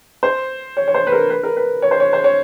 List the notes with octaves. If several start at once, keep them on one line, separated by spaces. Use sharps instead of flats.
C5
C#5
C#5
C5
B4
A#4
B4
A#4
B4
C#5
C5
C#5
C5
C#5